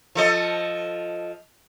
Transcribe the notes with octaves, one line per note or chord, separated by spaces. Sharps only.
F3 A4 D#5